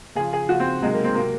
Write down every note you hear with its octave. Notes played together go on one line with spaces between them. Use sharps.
C#3 F3 G#4
G#4
C#3 F3 F#4
C4
C3 D#3 F#3 G#3
A#3
C4
C3 F#3 A#3